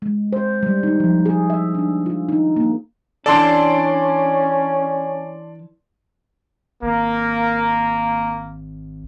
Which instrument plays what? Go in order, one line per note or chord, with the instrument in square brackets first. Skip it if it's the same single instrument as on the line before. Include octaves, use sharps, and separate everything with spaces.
[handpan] G#3
C5
G3
D#4
F3
G#4
E5
D4
F4
D#4
A#3
[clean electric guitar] E3 D4 A4 [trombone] C#4 [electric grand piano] D5 A5 C6
[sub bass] G#1 [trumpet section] A#3